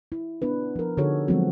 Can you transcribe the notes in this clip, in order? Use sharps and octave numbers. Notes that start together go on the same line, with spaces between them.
E4
B3 D4 B4
F3 A#4
D3 D#4 F#4 G#4 A4 C#5
F3 F#3 G#3 B3 C4 F#4